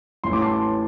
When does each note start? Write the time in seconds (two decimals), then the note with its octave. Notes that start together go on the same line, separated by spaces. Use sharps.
0.24 A1 A2 E3 C6
0.33 D6
0.42 A5 C6